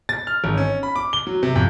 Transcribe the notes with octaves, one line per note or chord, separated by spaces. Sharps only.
A6
F6
G#1
C#4
B5
D6
G7
F#3
C3
F2